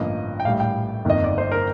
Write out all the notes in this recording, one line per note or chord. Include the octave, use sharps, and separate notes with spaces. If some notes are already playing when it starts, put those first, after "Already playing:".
Already playing: A1 G2 D3 F3 A#3 D#5
G5
A#1 A2 G3 F5
G5
G1 F2 D#3 A#3 D#5
D5
C5
A#4